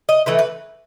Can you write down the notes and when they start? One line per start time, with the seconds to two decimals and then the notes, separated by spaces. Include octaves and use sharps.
0.09 D#5
0.26 E3 A3 E4 B4
0.39 B4